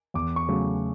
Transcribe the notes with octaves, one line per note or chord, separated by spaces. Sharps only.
E2 D6
C#6
C#3 F#3 A3